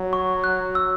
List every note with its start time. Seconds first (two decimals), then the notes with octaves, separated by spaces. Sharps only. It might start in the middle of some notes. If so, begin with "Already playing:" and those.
Already playing: F#3
0.13 C#6
0.44 F#6
0.75 E6